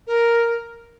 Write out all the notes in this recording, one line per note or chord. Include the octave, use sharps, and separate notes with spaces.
A#4